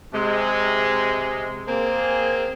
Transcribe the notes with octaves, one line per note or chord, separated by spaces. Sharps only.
C3 G#3
A#3 C4 G#4